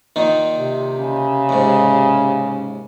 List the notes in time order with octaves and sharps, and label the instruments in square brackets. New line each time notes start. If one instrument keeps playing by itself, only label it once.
[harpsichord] A#2 D#3 D#4
[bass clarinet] C3
[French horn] C#3
[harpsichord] D#2 G#2